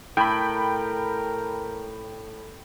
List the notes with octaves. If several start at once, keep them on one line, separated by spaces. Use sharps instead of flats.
A2 A#4 G5 B5